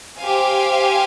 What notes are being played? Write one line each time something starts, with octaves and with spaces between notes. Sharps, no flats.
G4 C5 F5 G#5